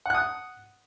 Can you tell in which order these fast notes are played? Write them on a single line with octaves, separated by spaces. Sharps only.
F#5 F#6 D#6